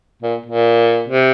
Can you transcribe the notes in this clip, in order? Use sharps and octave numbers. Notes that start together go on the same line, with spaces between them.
A#2
A#2
C3